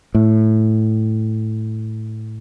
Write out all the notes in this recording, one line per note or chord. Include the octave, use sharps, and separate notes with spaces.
A2